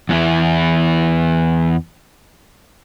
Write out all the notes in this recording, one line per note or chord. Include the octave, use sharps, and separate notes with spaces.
E2 E3 E4